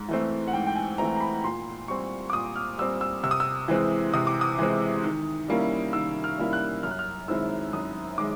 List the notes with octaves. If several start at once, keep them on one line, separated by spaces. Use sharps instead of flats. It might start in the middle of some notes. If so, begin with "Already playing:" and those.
Already playing: G#2
E3 A3 C4
F#5
G#2 G5
G5
G#5
E3 A3 C4 A#5
A#5
B5
A#2 C6
G3 C4 C#6
D6
A#2 D#6
F6
G3 C4 E6
E6
C3 E6
D#6
E6
E3 G#3 C4
C3 D#6
D6
D#6
E3 G#3 C4
D#3
G3 A#3 C#4 E4
D#3 E6
F6
G3 A#3 C#4 E4
F#6
F#2 F6
F#6
F6
D#3 G#3 C4 E4 E6
F#2 D#6
D#3 G#3 D6